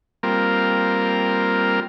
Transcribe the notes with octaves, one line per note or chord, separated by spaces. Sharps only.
G3 A#3 C4 F4 A#4